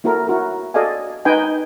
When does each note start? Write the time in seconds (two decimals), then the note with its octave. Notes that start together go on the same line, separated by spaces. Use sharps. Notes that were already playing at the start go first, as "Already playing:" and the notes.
0.04 A#3 E4 F#4 A4 A#4
0.27 E4 F#4 A#4
0.74 F#4 A4 D5 D#5 F5 G#5
1.25 D#4 B4 D#5 G5 G#5